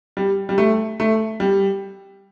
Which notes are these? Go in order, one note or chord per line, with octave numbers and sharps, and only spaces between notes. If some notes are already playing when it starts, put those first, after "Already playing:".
G3
G3
A3
A3
G3